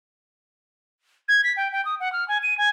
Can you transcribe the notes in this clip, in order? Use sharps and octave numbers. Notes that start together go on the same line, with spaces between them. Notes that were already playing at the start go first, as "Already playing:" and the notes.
G#6
B6
G5
G5
D#6
F#5
F6
G#5
D#7
G#5